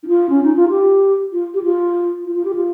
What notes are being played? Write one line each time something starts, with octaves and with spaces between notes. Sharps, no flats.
D#4
F4
C#4
D#4
F4
G4
F4
G4
F4
F4
F4
G4
F4